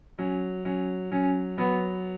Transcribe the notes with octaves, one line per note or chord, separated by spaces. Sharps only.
F#3 C#4
F#3 C#4
F#3 C#4
F#3 B3